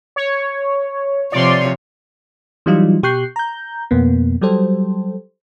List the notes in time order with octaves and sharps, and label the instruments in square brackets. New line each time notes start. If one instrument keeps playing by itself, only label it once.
[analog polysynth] C#5
[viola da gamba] C3 F3 C#5 [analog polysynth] D5 C6
[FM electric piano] E3 F#3 G3 D#4 F4
B2 G4 C#6 F#6 G6 C7
A#5 G6
F2 B2 A#3 B3
F#3 G3 G4 A4 C5